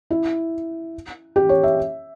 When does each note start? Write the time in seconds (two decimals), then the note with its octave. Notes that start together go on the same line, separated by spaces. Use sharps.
0.11 E4
1.36 G4
1.49 C#5
1.63 E5